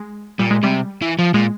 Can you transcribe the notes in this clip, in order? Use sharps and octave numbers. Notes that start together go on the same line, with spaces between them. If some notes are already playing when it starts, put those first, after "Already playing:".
Already playing: G#3
A#2 G3
G#3
C3 G3
E3
F3
A#2 G#3